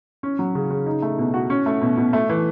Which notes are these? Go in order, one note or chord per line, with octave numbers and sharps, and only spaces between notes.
C#4
F#3
C#3
C#3
D#4
A3
B2
F#4
C#4
A3
B2
B2
A3
E3